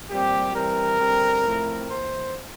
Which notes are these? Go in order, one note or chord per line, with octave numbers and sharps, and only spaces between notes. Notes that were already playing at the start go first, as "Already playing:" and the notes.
A#2 G3 C4 G4
E3 G3 C4 A#4
D3 G3 C4
A2 F3 A3 C4
E3 A#3 C5